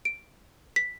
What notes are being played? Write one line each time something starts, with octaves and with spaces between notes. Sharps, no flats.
D7
B6